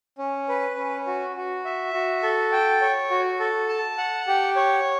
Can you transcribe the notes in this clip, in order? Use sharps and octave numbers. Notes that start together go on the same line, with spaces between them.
C#4
B4
C#4
F#4
F#4
E5
F#4
A4
G5
C#5
F#4
A4
A5
F#5
G4
C#5